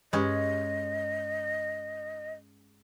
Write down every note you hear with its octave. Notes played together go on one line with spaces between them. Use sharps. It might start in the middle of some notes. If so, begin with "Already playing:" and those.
G2 G#3 C#4 G4 B4 D#5